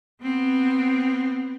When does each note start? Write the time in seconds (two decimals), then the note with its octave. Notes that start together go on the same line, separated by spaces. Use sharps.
0.23 B3 C4